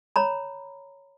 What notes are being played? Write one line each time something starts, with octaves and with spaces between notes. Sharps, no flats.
C#5 A#5 B5